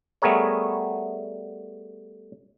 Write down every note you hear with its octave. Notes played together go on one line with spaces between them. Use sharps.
G3 A3 B3 G#4 A#4 C#5